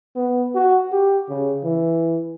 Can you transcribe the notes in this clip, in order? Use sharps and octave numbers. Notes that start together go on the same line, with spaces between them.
B3
F#4
G4
C#3
E3